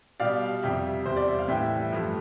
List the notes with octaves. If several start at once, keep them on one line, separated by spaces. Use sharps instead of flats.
B2 G3 D5 F5
F2 C3 G3 E5 G5
E2 C3 G3 C5
D5
E5
F5
A2 E3 G3 E5 G5
G2 F3 A3